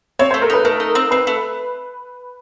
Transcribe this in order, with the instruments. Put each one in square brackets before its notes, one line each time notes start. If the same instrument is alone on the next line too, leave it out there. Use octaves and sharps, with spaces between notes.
[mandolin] C4 [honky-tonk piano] C#5
[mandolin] A3 [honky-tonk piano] C5
[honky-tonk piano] A#4
[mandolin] D#4 [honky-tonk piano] B4
[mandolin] A3 [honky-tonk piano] A#4
[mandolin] D#4
C4
[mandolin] C4 [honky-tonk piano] B4
[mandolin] A3